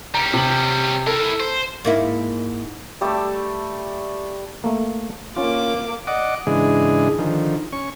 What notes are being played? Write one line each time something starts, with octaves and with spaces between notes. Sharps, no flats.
G3 C#4 A#5 D7
C3 F#7
E4 A4 A#4
C5
G#2 A#3 E4
G3 A3 G4 A4 D5
A3 A#3
A#3 C#4 F4 D6
D5 D#5 F#5 D6
G#2 C#3 E3 G#3 D4 G#4
D3 D#3 F3
C#4 C#6